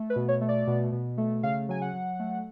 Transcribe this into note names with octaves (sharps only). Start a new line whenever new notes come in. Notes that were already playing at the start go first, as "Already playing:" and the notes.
Already playing: A3
B4
B2
C#5
A3
D5
B2
B2
A3
C#3 F5
F#3 G#5
F#5
F#3
A3